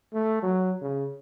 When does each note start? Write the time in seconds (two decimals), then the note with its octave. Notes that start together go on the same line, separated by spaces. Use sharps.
0.14 A3
0.43 F#3
0.82 C#3